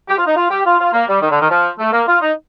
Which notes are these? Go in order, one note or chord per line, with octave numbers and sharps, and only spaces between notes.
G4
F4
D#4
F4
G4
F4
F4
A#3
G3
D#3
D3
D#3
F3
A3
A#3
F4
D#4